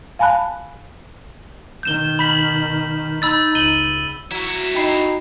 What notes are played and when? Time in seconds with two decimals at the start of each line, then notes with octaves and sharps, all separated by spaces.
0.19 F5 G#5 A5 B5 F#6
1.83 B2 D#3 G6 E7 G7
2.19 B5 B6 F#7
3.22 D#4 B5 E6 A6
3.55 C#2 D#7 F#7 G7
4.31 F#3 E4 F#4
4.75 D#4 G5 B5 C7